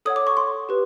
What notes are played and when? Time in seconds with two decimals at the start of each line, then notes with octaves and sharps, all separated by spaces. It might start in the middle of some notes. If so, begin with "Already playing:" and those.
0.05 A4 C#5 F#5 D#6
0.16 D6
0.27 C#6
0.37 C6
0.69 G4 B4